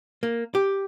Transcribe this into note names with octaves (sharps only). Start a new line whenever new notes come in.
A#3
G4